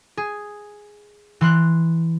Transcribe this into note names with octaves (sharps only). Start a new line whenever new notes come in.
G#4
E3 C6 F#6